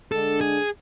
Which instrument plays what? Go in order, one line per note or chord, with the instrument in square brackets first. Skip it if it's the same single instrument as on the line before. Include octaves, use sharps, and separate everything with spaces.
[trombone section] D3 G#3 D4 [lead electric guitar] A4
[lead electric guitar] G#4